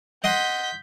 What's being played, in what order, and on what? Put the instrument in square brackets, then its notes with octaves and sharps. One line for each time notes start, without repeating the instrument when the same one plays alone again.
[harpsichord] D#5 F#5 C6 [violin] G6 B6